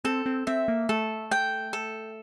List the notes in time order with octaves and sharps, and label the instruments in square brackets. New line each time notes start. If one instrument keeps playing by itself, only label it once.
[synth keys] C4 [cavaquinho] A4
[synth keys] C4
[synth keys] C4 [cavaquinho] E5
[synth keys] A#3
[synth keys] A3 [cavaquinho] A4
[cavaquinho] G5
A4